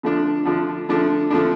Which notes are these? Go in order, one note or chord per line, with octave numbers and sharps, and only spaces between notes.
D3 F3 A3 D4
D3 F3 A3 D4
D3 F3 A3 D4
D3 F3 A3 D4